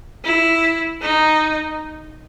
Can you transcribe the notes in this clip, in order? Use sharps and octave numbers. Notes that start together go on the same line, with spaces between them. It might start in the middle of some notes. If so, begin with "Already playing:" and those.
E4
D#4